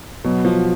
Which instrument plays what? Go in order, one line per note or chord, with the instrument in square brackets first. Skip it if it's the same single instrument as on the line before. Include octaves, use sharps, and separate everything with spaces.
[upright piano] B2 [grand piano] F#3
[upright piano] F3